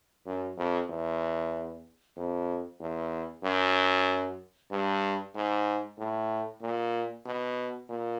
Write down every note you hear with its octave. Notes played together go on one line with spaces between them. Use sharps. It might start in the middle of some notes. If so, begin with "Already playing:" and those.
F#2
F2
E2
F2
E2
F#2
G2
G#2
A2
A#2
B2
A#2